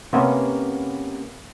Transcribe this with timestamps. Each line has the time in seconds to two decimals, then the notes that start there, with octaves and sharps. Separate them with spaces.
0.13 C3 A#3 B3 C#4